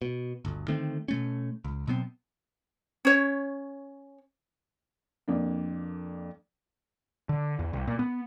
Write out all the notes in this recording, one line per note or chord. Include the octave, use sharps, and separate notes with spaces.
B2
G1 D2
D3 D#3 A3 C4
B2 A3 C#4
C#2
B2 F#3 B3 C4
C#4 C#5
F2 A#3 D4
D3
E2
C2
A#2
B3